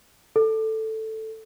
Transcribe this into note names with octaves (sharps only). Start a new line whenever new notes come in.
A4